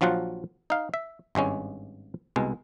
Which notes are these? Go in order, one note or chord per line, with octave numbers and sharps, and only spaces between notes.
A#1 F3 F#3 F4 F#5
D#4 F5
E5
G#1 G2 G#3 C#4
C2 B2 G#3